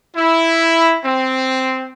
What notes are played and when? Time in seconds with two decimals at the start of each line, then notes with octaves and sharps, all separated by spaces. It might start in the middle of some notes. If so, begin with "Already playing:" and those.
0.15 E4
1.05 C4